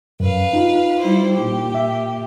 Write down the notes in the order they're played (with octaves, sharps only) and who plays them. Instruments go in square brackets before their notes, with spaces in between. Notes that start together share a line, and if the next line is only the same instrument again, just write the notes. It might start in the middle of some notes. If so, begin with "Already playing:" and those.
[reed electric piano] F#2 [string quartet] B4 F5
[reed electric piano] D#4 F4
[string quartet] G3 E4 C5
A#2 G4
[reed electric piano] E5